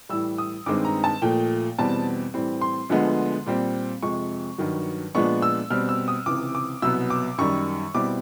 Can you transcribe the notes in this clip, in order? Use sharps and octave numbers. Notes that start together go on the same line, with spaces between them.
A2 E3 G3 E6
D#6
G2 D#3 G#3 C4 D#4 D6
A#5
A5
A#2 F3 A3 G5
E2 B2 G3 C4 A5
A2 E3 G3 C4
C6
D2 D3 F3 G#3 B3
A#2 G3 C4
F2 C3 F3 G#3 C#6
G2 D#3 F#3
A#2 F3 G#3 B3 D4 C#6
E6
B2 G3 C4 F6
E6
D#6
C#2 C3 E3 D6
D6
C2 B2 F#3 B3 E6
D6
F#2 D#3 G3 C#6
B2 G3 C4 E4 D6